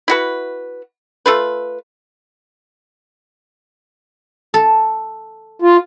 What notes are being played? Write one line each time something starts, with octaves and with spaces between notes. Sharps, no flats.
E4 F#4 B4
A3 F4 B4
A4
F4